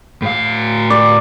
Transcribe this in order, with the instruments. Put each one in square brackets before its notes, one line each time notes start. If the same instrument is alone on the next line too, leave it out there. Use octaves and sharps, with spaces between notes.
[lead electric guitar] A2 F5
[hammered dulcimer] D5